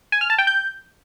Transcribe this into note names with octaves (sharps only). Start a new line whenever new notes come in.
G#5
F6
A5
G5
G6